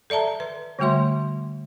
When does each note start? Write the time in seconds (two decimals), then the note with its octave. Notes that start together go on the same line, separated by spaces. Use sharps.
0.10 A4 D5 E5 A5 A#5
0.40 B4
0.79 D3 G3 A3 F#4 E5 C6